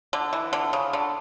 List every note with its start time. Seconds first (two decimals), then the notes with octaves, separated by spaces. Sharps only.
0.13 D3
0.33 E3
0.53 D3
0.73 C#3
0.93 D3